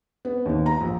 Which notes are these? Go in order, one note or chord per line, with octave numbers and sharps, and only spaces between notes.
B3
D#2
A#5
A#1